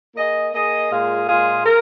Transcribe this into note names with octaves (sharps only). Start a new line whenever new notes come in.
A#3 G#4 D#5
A#3 G#4 D#5
A#2 G#3 F4 G#4 F5
A#2 G#3 F4 G#4 F5
A#4